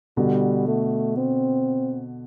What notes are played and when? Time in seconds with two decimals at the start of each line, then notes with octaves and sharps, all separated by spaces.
0.17 B2 D3 G3
0.68 A3
1.17 C4